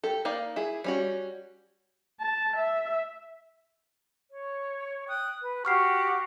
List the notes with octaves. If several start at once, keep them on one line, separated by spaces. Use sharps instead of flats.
G4 A4
A#3 D#4 D5 F5
E4 G#4
G3 C#4 F#4
A5
E5
C#5
G5 D#6 F#6
B4
F#4 G4 F#5 C#6 F6 C7